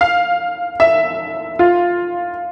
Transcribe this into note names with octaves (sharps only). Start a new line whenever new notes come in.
F5
E5
F4